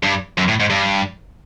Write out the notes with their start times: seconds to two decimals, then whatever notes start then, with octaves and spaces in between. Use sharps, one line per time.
0.03 G2
0.37 F#2
0.48 A2
0.60 G#2
0.70 G2